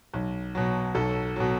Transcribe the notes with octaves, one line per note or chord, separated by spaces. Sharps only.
B1
B2 F#3
B1 A4
B2 F#3